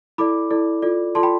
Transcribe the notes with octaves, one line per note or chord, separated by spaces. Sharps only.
E4 A4 D5 B5 D6
E4 A4 D5
F4 A4 D5
F4 A4 D5 A5 C6
G5 B5